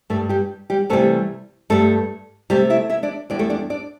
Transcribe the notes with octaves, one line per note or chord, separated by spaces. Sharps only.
G2 G3 A3 A4
G3 G4
G3 G4
C3 E3 G3 A3 A4
G2 G3 A3 A4
C3 G3 A3 G4
E4 E5
E4 E5
D4 D5
E2 D3 G3 D4 D5
A3 A4
D4 D5
D4 D5